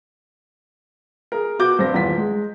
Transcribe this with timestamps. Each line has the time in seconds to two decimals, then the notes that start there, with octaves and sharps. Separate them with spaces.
1.32 G#4 A#4
1.59 B2 F#4 D6 G6
1.79 G2 C4 A#6
1.93 D#1 E2 F4 B6
2.18 G#3